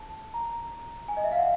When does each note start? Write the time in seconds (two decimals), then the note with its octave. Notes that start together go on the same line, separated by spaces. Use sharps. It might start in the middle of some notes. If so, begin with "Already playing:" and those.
Already playing: A5
0.34 A#5
1.08 G#5
1.17 D#5
1.24 E5
1.32 F5
1.38 F#5